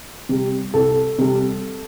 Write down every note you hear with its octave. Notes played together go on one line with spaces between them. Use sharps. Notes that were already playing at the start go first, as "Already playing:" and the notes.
C3 G3
C2 A4
C3 G3